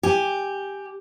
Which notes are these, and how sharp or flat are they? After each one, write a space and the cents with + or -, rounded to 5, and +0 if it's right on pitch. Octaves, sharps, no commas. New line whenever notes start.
G4 +5 G#5 +0